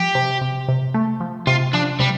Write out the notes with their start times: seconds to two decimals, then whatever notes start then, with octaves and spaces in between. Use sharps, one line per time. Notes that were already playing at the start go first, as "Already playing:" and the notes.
Already playing: F3 G4
0.15 C3
0.41 C3
0.68 C3
0.94 A3
1.20 F3
1.47 C3 F4
1.73 F3 D4
2.00 C3 G3